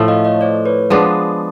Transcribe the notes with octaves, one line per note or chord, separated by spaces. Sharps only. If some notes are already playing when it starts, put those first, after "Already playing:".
Already playing: A2 F3 A3
D#5 F5
C#5 D#5
C5 D5
B4 C#5
F3 G#3 B3 D4